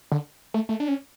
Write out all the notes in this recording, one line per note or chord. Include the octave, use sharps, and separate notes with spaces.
D3
A3
A3
D4
C#4